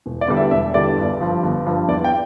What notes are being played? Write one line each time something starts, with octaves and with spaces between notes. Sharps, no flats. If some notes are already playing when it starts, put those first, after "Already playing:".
E1
D5
E2 D3 G3
E5
E1 E5
E2 D3 G3 D5
G1
G2 F3
G1
G2 F3
E2 D5
G5